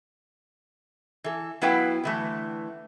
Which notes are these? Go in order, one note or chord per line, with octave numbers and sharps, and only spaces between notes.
E3 A4
F#3 B3 E4 B4 F5 G5
D3 E3 A3